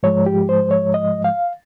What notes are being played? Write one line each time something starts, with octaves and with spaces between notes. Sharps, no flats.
G#2 F3 G#3 C#5
G4
C5
C#5
D#5
F5